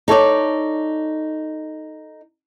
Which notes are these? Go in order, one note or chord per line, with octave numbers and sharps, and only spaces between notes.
D#4 A4 C#5 D5